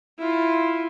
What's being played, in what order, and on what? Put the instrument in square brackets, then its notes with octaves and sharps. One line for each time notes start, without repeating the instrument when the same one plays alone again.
[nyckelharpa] E4 F4